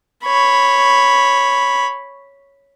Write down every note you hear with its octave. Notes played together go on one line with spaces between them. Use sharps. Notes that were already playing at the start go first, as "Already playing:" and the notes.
C#5 B5